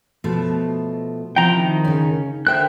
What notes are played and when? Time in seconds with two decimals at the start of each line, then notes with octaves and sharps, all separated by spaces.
0.24 B2 F3 A3
1.36 C3 F3 E4 G5 A#5
1.56 D#3
1.84 C#3 C#4
2.47 D3 A#4 C5 E5 G5 F#6